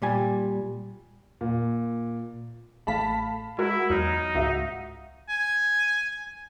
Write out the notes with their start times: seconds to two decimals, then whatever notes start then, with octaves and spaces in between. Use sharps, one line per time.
0.02 A#2 G3 G#5
1.41 A#2
2.87 A1 A3 F5 A5 B5 B6
3.58 G#3 E4 F#4 A#4
3.90 E2 F#3 D#4 F6
4.35 C#2 G#2 F#4 E5 F5
5.29 G#5